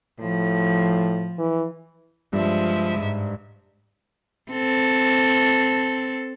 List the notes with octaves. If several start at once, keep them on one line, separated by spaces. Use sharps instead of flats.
A2 F3
E3
G2 F3 G#3 E5
G#2
C4 A4